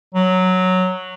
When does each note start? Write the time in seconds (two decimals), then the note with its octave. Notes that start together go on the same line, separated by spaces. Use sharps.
0.14 F#3